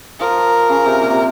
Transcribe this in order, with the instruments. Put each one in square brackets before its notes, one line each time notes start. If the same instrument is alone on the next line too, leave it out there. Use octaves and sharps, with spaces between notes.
[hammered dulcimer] F3 [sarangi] A#4
[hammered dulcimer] C#3
C3
A#2
C3